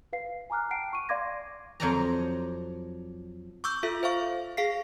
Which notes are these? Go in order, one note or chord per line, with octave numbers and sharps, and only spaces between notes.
B4 F5 C7
G#5 A#5 D6 F6 F#6
F#5 G5 A5 C7 D7
C#6 D#7
D5 F5 C6 D6 G#6 A#6
F2 F#3 C5 D5 D#5 A#5
C#6 D6 E6 G6
F4 A4 E5
C5 E5 F5 C#6
G#4 F5 B6 C7